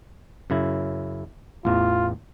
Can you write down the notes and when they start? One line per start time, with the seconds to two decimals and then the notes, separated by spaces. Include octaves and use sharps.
0.50 F#2 C#3 E4
1.65 A1 E2 F4